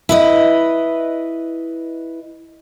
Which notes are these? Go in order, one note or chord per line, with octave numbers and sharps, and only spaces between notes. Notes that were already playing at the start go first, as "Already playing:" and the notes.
E4 B4 D#5